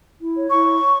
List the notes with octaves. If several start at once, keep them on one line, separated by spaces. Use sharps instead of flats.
E4
C#5
E4 C#6
C#5
C#5